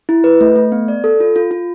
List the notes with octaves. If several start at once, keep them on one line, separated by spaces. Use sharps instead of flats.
E4
B4
A3
A3
B3
D5
A4
F4
F4
F4